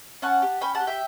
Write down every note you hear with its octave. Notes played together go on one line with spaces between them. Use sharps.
C#4 F#5 A5
G4
C#4 G5 B5
F#5 A5
G4
E5 G5